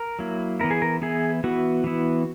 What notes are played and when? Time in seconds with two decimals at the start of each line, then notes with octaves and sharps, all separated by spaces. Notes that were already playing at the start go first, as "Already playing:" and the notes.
Already playing: A#4
0.19 F#3 A#3 E4
0.60 E3 B3 E4 A#4
0.71 G#4
0.82 A#4
1.02 E3 B3 E4 G#4
1.44 E3 B3 E4 F#4
1.84 E3 B3 E4